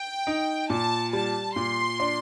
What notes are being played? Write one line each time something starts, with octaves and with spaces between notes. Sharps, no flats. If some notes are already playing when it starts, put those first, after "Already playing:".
Already playing: G5
D#4
A#2 A5
G3 A5
A#2 C6
D4